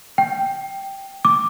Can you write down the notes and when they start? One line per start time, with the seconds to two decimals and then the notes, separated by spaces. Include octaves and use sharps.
0.18 G5
1.25 D6